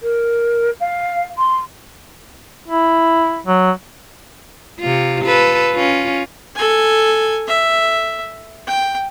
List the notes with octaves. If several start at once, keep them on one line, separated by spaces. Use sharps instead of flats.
A#4
F5
C6
E4
F#3
C3 F4
F4 A4 B4
C#4 F4
A4 G#5
E5
G5